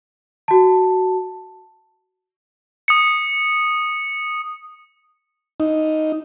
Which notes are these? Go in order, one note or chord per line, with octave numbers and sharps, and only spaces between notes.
F#4 A5
D#6 C#7
D#4